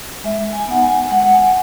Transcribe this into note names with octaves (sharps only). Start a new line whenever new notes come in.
G#3 E5
G#5
B3 D#4 F#5
G#5
G#3 F#5
F#5
G#5